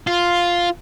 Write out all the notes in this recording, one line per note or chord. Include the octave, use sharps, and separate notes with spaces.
F4